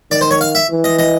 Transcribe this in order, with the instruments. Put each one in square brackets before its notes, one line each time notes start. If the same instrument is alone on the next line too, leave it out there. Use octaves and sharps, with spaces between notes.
[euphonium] D#3 [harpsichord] D5
[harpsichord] C5
C#5
F5
E5
[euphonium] E3
[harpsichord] D#5
D#5